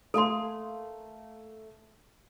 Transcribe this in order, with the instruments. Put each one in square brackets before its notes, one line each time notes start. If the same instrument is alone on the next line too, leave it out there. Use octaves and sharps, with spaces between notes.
[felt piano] A3 [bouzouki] A#3 F5 G#5 [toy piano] A4 C6